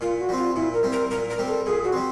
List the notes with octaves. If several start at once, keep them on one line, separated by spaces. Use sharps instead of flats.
A#2 F4
F#4
G3 C4
F4
A#2 E4
A#4
G3 C4
A#4
A#2 A#4
A#4
G3 C4
A4
A#2 G#4
F#4
G3 C4